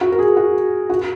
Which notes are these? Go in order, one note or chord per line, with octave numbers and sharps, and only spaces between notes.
F#4
A#4
G#4
F#4
F#4